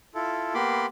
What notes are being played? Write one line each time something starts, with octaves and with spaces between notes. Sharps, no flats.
E4 F4 A4
A#3 B3 G4 B5 C6 D6